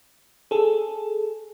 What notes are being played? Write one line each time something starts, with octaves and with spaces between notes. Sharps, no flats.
G#4 A4